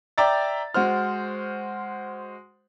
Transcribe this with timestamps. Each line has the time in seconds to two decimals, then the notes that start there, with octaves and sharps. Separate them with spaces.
0.18 D5 E5 G5 A#5 E6 A6
0.74 G#3 F#4 C5 F6